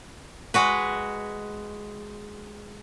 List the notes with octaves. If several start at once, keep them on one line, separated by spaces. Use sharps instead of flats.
G#3 F#4 B4